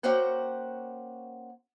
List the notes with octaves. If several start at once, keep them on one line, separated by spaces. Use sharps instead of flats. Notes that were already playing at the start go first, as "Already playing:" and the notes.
A#3 C#4 F#4 C5 F#5 G5